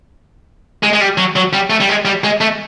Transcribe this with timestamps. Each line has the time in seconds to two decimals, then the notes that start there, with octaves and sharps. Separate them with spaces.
0.83 G#3
0.93 G#3
1.01 G3
1.18 F#3
1.36 F#3
1.53 G3
1.70 A3
1.80 G3
1.89 G#3
2.05 G3
2.24 G#3
2.41 A3